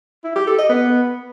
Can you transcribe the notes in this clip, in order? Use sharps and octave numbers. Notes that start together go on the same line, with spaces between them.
E4
G4
A4
D#5
B3